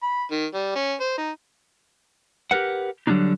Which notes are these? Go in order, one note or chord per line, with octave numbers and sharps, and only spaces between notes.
B5
D#3
G3
C#4
C5
D#4
G4 G#4 A#4 B4 F#5
D3 F#3 G3 A#3 D4 D#4